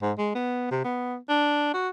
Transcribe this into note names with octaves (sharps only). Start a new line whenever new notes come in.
G#2
G#3
B3
C3
B3
D4
F#4